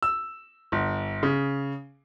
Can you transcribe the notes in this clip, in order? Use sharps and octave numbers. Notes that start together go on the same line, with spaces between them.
E6
G1
C#3